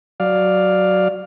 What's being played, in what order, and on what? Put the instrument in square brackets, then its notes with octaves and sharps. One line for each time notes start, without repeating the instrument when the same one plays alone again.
[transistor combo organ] F#3 D5 F5